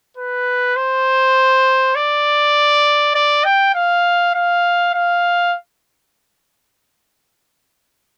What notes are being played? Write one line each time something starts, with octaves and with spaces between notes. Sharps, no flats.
B4
C5
D5
D5
G5
F5
F5
F5